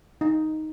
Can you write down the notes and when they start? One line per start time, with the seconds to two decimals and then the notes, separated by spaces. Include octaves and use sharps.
0.21 D#4